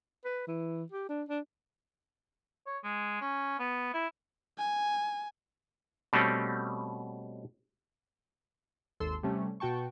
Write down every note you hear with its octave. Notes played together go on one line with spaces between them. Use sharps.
B4
E3
G4
D4
D4
C#5
G#3
C#4
B3
E4
G#5
B2 G3 A3 C4 C#4
G#1 D#2 A4 C6 E6
C3 G3 A3 C#4
B2 F#4 G5 A5 C#6